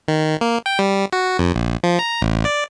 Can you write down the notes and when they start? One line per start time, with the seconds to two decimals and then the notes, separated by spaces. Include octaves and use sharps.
0.08 D#3
0.41 A#3
0.66 G5
0.79 G3
1.13 F#4
1.39 F2
1.56 A#1
1.83 F3
1.99 A#5
2.22 A1
2.45 D5